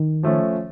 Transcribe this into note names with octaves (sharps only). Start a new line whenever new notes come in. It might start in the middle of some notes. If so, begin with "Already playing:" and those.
Already playing: D#3
F3 A3 C#4